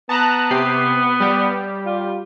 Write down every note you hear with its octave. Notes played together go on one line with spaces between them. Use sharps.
B3 A5 A#5 F#6
C3 G4 C7
G3 G4
F4